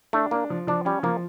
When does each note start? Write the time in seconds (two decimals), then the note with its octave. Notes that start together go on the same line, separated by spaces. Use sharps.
0.13 A3 D4
0.31 A#3 D4
0.50 F3
0.67 F3 D4
0.85 G3 C#4
1.03 F3 A#3